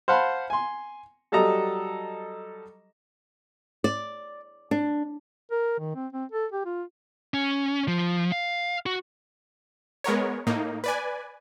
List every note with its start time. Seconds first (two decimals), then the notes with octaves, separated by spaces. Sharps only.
0.08 C5 F5 F#5 A5 B5
0.50 G#5 C6
1.32 F#3 G3 A4 D#5 A#5 D#6
3.84 D5
4.71 D4
5.51 A#4
5.79 D#3
5.96 C4
6.13 C4
6.32 A4
6.52 G4
6.65 F4
7.34 C#4
7.88 F3
8.32 F5
8.86 F#4
10.04 G#3 B3 A#4 C#5
10.47 A2 A#3 D#4
10.84 B4 D5 G#5